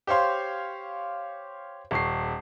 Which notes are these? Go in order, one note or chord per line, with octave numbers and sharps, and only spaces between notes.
G4 C5 C#5 F5 C6
D#1 C#6 C7